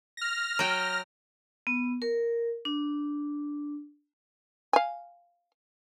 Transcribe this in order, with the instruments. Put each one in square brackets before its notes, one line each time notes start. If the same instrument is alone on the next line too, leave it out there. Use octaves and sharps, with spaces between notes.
[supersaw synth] F6 A#6
[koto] F#3 G5
[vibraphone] B3
A#4
D4
[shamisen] F5 G#5